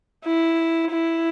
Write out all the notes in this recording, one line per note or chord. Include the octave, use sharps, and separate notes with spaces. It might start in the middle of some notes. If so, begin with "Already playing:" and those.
E4
E4